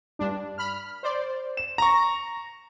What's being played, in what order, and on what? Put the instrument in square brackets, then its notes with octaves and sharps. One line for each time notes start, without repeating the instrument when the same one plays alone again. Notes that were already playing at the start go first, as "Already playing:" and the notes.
[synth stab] G2 D4
B5 F6
C5 D5
[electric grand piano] E7
[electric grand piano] A#5 C#6 [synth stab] A#6